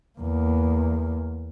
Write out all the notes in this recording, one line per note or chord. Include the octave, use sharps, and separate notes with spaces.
E2 A#3